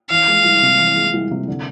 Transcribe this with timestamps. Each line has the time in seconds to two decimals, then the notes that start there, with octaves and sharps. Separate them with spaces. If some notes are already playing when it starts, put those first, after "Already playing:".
0.10 E3 F5
0.28 G#3
0.45 C2
0.62 C3
0.79 E3
0.96 G#3
1.13 C2
1.31 C3
1.48 D3